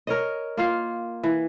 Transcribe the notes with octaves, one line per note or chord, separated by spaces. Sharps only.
A#4 C#5 D#5
A#3 F4 F5
E3